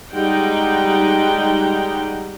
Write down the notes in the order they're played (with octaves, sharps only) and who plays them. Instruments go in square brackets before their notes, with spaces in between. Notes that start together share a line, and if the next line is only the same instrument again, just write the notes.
[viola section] G3 G#3 D#4 F#5 G5